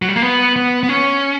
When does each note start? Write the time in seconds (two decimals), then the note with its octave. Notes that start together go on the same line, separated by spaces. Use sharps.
0.02 F#3
0.08 G3
0.16 A#3
0.22 B3
0.56 B3
0.83 B3
0.89 C#4